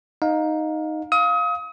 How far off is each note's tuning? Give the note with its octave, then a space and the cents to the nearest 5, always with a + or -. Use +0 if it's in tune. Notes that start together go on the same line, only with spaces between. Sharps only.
D#4 +0 F5 +25
F5 +5 D#6 +35